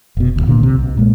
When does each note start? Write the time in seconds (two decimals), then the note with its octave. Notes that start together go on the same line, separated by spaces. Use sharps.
0.17 F1 B2
0.36 D1 G#1 D2
0.47 A#2 D3 A#3
0.62 B1 C3
0.78 B1
0.97 A#2 G#3 A#3